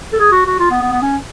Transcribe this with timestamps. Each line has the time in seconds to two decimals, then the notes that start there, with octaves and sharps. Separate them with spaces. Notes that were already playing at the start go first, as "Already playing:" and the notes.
0.13 A4
0.19 G#4
0.32 F#4
0.47 F#4
0.60 F4
0.71 B3
0.82 B3
0.92 B3
1.02 C#4